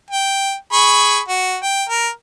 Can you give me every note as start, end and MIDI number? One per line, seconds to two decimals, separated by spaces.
0.11 0.54 79
0.73 1.19 68
0.73 1.19 83
0.73 1.19 85
1.28 1.57 66
1.63 1.84 79
1.89 2.09 70